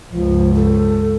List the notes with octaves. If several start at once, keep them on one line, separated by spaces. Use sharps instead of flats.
C#2 G2 F3
A4